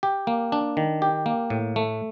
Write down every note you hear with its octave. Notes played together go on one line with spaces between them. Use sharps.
G4
A#3
D4
D#3
G4
A#3
A2
A3